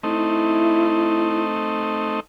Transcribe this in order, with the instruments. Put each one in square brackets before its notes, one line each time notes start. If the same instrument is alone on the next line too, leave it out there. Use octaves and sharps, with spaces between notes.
[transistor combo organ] A3 C4 D#4 [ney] E4